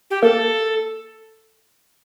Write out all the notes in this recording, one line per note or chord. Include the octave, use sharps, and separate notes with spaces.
G4
A#3 A4